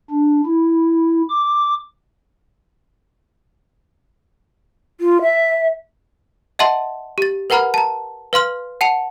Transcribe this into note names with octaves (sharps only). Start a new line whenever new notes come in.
D4
E4
D6
F4
E5
D#5 E5 F#5 A5 C6
G4 A6
A#4 B4 F#5 A#5 B5 F6
A5 A#5
B4 F5 C6 F6
F#5 A5 C#7 F7